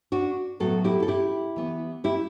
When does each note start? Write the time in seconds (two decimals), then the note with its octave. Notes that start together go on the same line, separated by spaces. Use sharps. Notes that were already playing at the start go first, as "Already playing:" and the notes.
0.12 D4 F#4
0.60 A2 F#3 B3 F#4 A4
0.84 E4 G4
1.03 A4
1.08 E4 G4
1.56 E3 B3
2.04 E4 G4